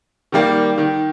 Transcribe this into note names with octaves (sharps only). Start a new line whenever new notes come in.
D#3 G3 A#3
D#3